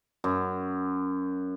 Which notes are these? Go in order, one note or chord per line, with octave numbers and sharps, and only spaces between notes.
F#2